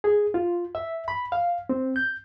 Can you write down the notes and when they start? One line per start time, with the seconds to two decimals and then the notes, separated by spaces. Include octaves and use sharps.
0.04 G#4
0.34 F4
0.75 E5
1.08 B5
1.32 F5
1.69 C4
1.96 G6